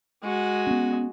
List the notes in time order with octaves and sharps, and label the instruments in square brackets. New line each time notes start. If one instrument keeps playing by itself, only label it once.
[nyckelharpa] G#3 F#4
[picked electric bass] B3 C#4